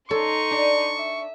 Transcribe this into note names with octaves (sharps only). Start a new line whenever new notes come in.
D#4 A4 C#5 C6 C#6
D4 D5
E5